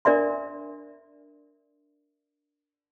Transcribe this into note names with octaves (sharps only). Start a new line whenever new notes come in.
D4 A#4 D5 E5 C6